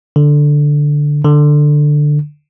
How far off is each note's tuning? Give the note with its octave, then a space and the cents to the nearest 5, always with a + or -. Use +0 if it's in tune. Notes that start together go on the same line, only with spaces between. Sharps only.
D3 +0
D3 +10